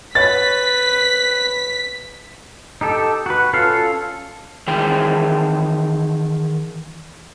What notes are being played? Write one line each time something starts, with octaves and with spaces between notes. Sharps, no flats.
B4 C#5 A6 B6
D#4 G4 A4
F#4 B4
C#4 F4 A4 F5
D#3 E3 G#4 G5